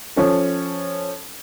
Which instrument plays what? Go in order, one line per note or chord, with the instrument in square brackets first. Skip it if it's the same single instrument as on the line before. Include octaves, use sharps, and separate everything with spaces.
[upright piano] F3 C#4 A4